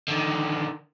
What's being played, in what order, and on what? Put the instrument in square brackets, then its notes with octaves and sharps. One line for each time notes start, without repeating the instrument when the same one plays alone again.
[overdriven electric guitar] D3 D#3